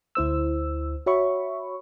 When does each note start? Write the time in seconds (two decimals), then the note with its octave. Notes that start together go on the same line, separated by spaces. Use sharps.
0.15 D2 E4 C5 E6
1.06 F#4 C#5 E5 B5 C#6